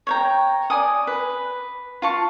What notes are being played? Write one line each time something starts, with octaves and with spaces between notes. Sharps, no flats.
C#5 G5 A#5
D5 G#5 D#6
B4
F4 A5 C#6